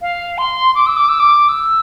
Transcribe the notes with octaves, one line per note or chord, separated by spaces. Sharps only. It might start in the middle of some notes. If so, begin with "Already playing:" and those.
F5
C6
D6
E6
D6
E6
D6
E6